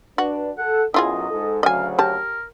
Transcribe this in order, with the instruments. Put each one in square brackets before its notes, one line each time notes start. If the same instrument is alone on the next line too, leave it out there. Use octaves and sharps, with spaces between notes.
[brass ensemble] D4 B4 [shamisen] F#4
[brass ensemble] A4 [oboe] F#5
[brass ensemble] B1 F#2 [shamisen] E4 F4 G#4 [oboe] D#5
[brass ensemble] G#2 A4
[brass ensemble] D2 C#3 F#3 [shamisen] D#5 G#5 [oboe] F5
[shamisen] G4 A5 [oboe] A#4